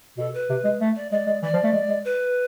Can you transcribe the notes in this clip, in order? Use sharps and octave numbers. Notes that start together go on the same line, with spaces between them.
B2 A4
B4
C3
G#3
A3
D5
G#3 D5
G#3
E3 D5
F3
A3
G#3
G#3
B4